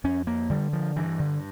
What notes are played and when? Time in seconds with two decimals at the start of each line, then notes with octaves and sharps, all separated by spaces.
0.04 F2 C#4
0.27 A#3
0.50 D3 G3
0.73 F3
0.96 G2 E3
1.19 D3